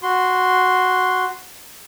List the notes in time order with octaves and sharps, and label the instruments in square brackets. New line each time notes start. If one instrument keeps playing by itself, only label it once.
[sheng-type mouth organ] F#4 C6